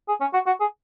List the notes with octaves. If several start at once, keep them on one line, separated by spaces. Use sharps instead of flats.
G#4
C#4
F#4
F#4
G#4